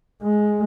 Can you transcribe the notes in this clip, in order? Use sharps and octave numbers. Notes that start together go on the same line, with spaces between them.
G#3